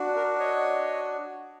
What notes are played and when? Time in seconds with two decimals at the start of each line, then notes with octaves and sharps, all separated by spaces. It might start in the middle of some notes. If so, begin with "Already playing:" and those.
Already playing: D4 F#4
0.16 A#4
0.39 C#5 D#5